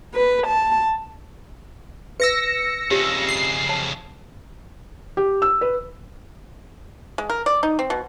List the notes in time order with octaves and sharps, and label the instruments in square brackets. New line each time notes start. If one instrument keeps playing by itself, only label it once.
[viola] B4
A5
[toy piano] B4 [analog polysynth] E6 A#6 C#7
[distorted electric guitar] F2 C#3 [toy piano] F4 G4 C#5
[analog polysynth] C7
[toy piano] C#5 A5
[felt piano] G4
E6
B4
[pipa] G#3
A#4
D5
D#4
C4
B2